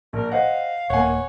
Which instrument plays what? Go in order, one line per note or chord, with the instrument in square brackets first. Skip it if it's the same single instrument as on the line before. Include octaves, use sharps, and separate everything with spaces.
[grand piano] A#1 [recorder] A#4
[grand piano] C5 D#5 F#5 [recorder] F5
[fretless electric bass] D#1 A#3 [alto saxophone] C#5 [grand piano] F#5 G#5